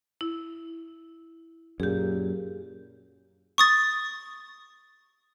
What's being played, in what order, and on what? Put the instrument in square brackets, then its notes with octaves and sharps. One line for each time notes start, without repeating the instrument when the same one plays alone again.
[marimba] E4
[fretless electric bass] F#2 A#2 [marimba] G4 G#4
[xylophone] C#6 D#6 A6